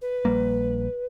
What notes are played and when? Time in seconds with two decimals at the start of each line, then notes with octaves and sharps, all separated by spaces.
0.01 B4
0.25 A#1 G3 A#3